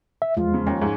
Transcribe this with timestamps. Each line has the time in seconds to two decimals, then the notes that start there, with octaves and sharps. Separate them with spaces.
0.22 E5
0.37 E2 F3 G#3 F4
0.54 C#3
0.67 D#2 C#4
0.82 G#2